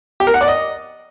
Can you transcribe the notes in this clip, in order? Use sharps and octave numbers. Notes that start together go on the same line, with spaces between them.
G4
A#4
F#5
D5
D#5